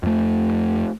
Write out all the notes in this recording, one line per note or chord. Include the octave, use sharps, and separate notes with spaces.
F2 A3